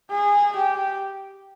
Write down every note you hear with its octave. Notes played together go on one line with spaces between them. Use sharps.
G#4
G4